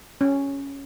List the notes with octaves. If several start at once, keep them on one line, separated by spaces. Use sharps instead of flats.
C#4